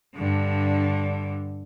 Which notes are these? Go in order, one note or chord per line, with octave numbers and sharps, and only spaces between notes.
G2 D3